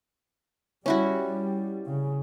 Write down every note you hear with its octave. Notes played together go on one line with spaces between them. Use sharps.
G3 C#4 E4 F#4
C#3